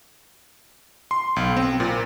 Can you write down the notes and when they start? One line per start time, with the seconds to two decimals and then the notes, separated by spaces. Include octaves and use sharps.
1.11 C6
1.36 B1
1.57 C4
1.80 A#2